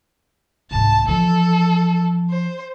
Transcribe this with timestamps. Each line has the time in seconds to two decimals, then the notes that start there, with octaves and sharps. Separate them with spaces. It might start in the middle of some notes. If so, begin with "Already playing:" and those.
0.71 C2 G#2 A5
1.08 E3 F3 A4
2.30 C5